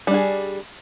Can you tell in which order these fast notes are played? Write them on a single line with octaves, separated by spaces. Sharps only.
G3 D4 G#4